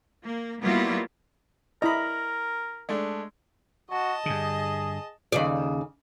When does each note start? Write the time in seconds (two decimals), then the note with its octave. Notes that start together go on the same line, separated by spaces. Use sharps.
0.23 A#3
0.61 F#3 G3 A#3 B3 E4 F4
1.82 E4 A#4 D5 D#5 A#5 B5
2.89 G#3 A3 D4
3.90 F#4 D#5 A5
4.26 G2 D3 G#4
5.32 D#2 C#3 D5